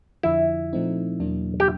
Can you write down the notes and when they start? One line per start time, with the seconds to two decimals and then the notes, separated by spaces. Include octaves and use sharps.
0.23 F2 D3 F3 E4
0.73 A#2 F3 A3 C4 D#4
1.20 E2 B2 F#3 A#3 D4
1.60 G4